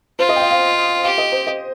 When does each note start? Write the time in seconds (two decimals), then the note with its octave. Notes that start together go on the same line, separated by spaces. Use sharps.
0.19 F4 C5
0.29 D#5
0.36 G5
0.40 F5
0.51 F5
1.03 G4 F5
1.18 D#5
1.32 C5
1.47 D#5